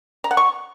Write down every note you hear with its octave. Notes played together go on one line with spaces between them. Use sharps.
A#5
F#5
C#6